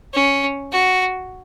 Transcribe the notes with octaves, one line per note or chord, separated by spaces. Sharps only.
C#4
F#4